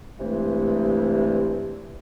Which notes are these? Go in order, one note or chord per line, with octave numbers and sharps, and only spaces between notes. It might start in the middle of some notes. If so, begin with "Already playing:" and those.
G2 C3 E3 G#3 A3